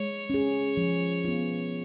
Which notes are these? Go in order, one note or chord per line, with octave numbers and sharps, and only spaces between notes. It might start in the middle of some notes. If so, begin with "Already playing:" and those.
Already playing: G#3 C#5
C#4 G#4
F3
B3 F4